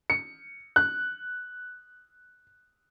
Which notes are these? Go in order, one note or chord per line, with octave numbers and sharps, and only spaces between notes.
C#7
F#6